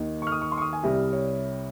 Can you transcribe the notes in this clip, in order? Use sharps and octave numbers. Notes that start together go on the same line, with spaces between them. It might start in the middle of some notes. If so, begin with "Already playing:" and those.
Already playing: D#2 D#3 A#3 D#4
C#6 F6
D#6
C#6
C6
C#6
D#6
G#5
C2 C3 G3
C#5